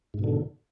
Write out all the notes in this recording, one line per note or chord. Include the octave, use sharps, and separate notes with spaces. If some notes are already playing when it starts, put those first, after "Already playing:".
G#2 B2 D3